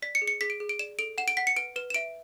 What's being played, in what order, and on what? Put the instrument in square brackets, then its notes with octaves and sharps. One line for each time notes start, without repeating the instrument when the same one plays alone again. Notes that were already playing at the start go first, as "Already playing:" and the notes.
[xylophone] D5 B6
C#7
G#4
C#7
G#4 B6
D7
G#4
D7
D5 E7
A4 D7
F#5 E7
D7
F#5 B6
C#7
B4 D7
B4 E7
E7
E5 D7